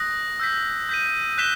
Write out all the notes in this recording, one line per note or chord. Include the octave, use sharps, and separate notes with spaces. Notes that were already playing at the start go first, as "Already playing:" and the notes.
Already playing: D#6 F#6 A#6
E6 G6 B6
G6 B6 D#7
F#6 B6 E7 G7